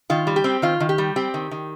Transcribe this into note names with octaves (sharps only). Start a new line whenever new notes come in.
D#3 F4
G3
G4
C4
D#3 F4
D#3
G4
G3
C4 G4
D#3
D#3